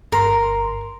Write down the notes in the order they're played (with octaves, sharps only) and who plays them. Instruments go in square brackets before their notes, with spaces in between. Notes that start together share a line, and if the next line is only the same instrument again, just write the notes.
[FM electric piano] G1 A#5 C6 [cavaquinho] A#4